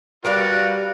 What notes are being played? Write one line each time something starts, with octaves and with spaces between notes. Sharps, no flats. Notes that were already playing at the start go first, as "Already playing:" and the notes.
G3 F#4 A#4 B4 D5 F5